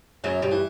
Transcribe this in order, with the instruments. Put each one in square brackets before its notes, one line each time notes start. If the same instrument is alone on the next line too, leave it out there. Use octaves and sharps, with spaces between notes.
[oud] F#2 F#3 [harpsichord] C#3
[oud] G2 G3
[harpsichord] E3